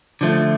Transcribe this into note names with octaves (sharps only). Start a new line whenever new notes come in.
D3 F3 A3